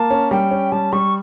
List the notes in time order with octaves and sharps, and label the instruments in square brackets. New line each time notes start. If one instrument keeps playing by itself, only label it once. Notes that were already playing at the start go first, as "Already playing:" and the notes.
Already playing: [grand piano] A#3 [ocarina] A5
[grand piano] C#4
[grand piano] G3 [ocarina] G5
[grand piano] C#4
[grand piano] G3 [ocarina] A5
[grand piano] G3 [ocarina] C#6